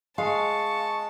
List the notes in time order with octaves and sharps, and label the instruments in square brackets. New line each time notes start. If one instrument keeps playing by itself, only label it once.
[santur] G#3 [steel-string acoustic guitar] F5 [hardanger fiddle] A5 [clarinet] C#6